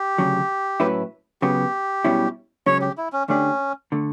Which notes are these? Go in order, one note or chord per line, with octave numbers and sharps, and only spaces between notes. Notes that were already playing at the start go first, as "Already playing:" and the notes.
Already playing: G4
D2 C#3 F#3
A2 F#3 C#4 E4 B4
C#3 F#3 B3 G4
B1 B2 G3 C#4 E4
C#2 C#3 F#3 C#4 C#5
G4
E4
C#4
D2 D3 A3 C#4 D4 G4
D3 A3